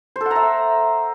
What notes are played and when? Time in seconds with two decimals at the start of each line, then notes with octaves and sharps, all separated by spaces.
0.16 C5
0.21 A4
0.26 F#5
0.31 A#5
0.36 E5